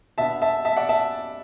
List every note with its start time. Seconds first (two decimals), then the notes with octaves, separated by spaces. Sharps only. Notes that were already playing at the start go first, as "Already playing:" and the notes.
0.18 B2 B3 D4 E5 A5
0.42 E5 A5
0.65 E5 A5
0.77 D5 F#5
0.89 E5 A5